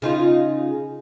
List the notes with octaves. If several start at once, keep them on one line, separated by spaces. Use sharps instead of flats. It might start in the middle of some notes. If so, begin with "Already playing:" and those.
C#3 D#4 F4